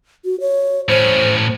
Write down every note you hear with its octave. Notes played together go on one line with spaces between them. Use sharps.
F#4
C#5
A2 C#4 C5